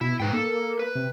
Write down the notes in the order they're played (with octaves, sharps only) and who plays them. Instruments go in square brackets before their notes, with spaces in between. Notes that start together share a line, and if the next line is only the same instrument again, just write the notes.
[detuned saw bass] B2 [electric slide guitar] E4
[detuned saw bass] G#2 [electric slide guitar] D#4 B4 G5
[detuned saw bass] A#3 [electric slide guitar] A4
[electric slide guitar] B4
[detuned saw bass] C3